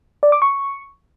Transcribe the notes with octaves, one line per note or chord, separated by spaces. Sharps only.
D5
D6
C#6